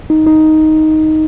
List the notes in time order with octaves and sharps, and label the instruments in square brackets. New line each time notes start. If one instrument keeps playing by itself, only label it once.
[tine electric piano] D#4
D#4